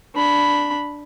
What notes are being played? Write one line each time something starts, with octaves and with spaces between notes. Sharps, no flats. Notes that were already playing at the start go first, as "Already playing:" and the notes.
D4 B5